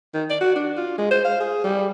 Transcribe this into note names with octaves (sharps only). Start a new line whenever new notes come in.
D#3
D5
F#4
D4
F4
G#3
C5
F5
G#4
G3